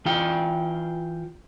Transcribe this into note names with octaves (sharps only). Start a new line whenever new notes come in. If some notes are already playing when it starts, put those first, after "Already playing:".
E3 F4 G5